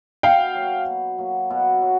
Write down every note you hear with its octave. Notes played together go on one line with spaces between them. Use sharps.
B2 F5 G5
F#3 A#3
B2
F#3 A#3
B2
F#3